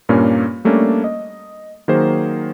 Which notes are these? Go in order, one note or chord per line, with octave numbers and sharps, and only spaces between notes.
G2 A#2 A#3 C#4
G3 A3 A#3 C#4 D4
D#5
D#3 F#3 A#3 G#4 C5